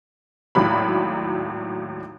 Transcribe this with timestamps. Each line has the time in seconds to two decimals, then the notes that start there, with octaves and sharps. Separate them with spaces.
0.55 G#1 D#2 A2 F#3 B5